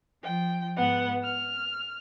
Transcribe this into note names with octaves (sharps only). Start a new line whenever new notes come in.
F3 G5
G#2 B3 F#5
F6